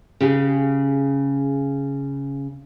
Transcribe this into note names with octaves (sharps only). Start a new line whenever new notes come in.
C#3 G4 G#4